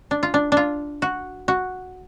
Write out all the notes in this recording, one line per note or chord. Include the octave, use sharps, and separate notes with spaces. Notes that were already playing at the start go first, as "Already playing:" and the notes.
D4
F4
D4
D4
F4
F#4
F#4